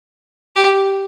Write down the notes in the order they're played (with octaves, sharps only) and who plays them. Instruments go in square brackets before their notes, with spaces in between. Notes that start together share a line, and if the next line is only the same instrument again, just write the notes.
[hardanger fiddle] G4